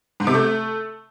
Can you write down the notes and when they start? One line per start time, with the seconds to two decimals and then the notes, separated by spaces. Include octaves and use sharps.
0.20 G#2
0.27 C3
0.34 A3